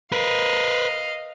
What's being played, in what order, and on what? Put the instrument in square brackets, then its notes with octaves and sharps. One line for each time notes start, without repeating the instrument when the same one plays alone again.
[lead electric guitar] A#4 B4 [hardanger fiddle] D#5 F5